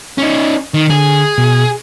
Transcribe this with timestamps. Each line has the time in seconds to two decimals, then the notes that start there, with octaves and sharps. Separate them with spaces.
0.18 C#4 D#4
0.74 D#3
0.90 D3 G#4
1.38 B2